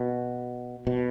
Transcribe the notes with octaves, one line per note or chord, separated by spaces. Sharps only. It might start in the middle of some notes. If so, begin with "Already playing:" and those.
Already playing: B2
B2